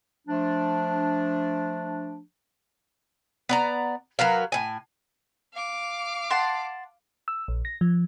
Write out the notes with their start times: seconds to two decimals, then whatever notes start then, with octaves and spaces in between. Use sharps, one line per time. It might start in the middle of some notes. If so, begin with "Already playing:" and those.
0.27 F3 A3 D4
3.49 B3 D5 A#5
4.19 F#3 A#4 B4 F5
4.52 A2 G#5
5.54 F5 D6
6.30 F#5 A5 C6
7.28 E6
7.48 A#1
7.65 A#6
7.81 F3